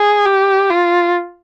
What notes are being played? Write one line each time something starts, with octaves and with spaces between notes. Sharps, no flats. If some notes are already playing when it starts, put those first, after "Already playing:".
Already playing: G#4
G4
F4